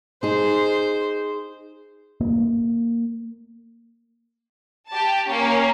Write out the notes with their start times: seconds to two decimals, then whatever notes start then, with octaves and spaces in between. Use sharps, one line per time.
0.23 D#4 G#4 C5
2.21 A#3
4.89 G4 A5
5.28 A#3 C#4